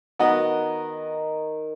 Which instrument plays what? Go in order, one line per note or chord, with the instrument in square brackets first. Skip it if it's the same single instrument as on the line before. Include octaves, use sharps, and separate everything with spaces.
[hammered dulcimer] D#3 [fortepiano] B3 F#4 D#5